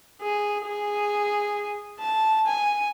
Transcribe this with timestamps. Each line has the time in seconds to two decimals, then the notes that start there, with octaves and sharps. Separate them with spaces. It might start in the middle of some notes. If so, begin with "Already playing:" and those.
0.22 G#4
0.65 G#4
2.00 A5
2.46 G#5